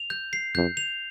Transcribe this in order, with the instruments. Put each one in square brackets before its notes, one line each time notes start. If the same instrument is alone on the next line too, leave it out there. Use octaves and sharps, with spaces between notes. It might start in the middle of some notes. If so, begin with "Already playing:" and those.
Already playing: [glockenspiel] F7
G6
C7
[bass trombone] F2 [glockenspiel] G6
[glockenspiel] F7